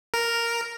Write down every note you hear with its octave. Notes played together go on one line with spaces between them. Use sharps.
A#4